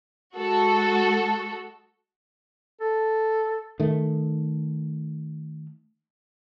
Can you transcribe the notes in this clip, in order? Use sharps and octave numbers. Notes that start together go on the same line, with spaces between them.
G#3 F#4 A4
A4
D#3 A3